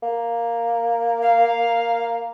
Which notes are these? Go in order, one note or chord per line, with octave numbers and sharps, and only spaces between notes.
A#3
F5